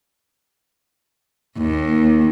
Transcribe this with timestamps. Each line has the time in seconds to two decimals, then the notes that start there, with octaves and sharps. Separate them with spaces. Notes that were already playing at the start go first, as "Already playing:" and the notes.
1.58 D#2